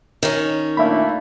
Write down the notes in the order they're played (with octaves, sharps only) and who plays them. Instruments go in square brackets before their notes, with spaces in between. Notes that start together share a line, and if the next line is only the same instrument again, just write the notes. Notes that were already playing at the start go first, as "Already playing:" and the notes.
[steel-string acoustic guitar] D#3 C#4
[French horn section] A#2 D4 [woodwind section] A3 A#3 [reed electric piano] E5 B5